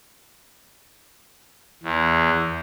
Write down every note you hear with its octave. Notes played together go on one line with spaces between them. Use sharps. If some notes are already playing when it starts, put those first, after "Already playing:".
E2